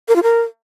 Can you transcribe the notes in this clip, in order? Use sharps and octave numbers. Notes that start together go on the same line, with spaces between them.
A#4
F4
A#4